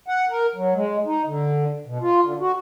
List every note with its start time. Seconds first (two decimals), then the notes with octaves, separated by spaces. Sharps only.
0.08 F#5
0.29 A#4
0.55 F#3
0.75 G#3
1.06 D#4
1.26 D3
1.86 B2
2.01 F4
2.23 D3
2.40 F#4